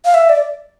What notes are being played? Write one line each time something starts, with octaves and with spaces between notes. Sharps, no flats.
F5
E5
D5